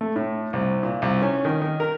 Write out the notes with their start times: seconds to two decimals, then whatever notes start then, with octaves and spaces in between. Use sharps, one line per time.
0.01 A3
0.16 A2
0.53 C2
0.83 A#2
1.02 C2
1.22 C#4
1.45 D#3
1.62 D#3
1.80 A#4